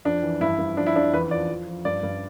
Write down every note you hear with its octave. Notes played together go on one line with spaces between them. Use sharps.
F2 D4
E3
G2 E4
G2
F3 D4
E4
F2 D4
E2 B4
F3 D5
F3
F3
G2 D5
G2